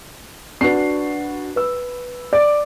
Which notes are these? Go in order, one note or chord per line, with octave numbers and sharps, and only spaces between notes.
D4 F#4 B4 C7
B4 E6
D5